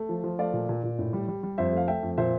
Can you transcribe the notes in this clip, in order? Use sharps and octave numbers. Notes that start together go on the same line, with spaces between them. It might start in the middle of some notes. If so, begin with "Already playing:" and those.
Already playing: A3
F3
F3
A3 D5 F5
A#2
A#2
A#2
A2
G3
G3
G3
F2 C5 E5
A3 F5
A3 E5 G5
F2
A#2 C5 E5